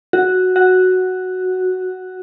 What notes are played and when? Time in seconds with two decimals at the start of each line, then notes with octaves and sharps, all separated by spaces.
0.13 F#4
0.56 F#4